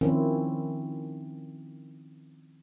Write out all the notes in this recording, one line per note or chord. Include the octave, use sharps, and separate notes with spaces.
D#3 F3 C4 C#4 E4